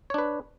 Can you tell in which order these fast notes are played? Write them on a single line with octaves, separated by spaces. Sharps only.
C#5 D4 B4